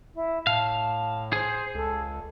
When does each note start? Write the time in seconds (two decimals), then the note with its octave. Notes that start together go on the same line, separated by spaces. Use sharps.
0.14 E4
0.47 A2 F5 A5
1.33 G#4 C5
1.75 C#2 A4